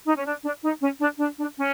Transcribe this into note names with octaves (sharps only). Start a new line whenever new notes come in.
D#4
C#4
D4
D4
D#4
C#4
D4
D4
D4
C#4